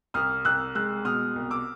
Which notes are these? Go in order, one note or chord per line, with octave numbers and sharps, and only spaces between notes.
C2 D#6 F6
C2 E6 F#6
G#3 E6 F#6
B2 D#6 F6
C2
D6 E6